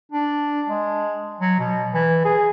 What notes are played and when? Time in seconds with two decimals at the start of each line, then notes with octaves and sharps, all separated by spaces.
0.12 D4
0.69 G#3
1.41 F#3
1.59 B2
1.94 E3
2.25 G#4